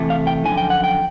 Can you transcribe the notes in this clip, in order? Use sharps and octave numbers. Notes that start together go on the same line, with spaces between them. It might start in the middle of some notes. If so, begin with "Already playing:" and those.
Already playing: C3 E3 A3
F5
G5
F#2 D3 F3 G#5
G5
F#5
G5